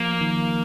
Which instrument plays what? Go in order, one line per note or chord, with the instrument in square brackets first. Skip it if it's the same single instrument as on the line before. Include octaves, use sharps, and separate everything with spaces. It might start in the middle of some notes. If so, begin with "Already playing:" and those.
Already playing: [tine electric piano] F3 [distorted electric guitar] A#3
[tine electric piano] D#3